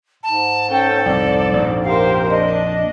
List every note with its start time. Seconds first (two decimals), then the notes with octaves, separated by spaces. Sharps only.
0.23 G#2 A5
0.70 C#4 A4 G5
1.06 C2 F2 D5
1.53 A#1 F2
1.84 G4 A#4 C5 F5
2.29 D4 D#5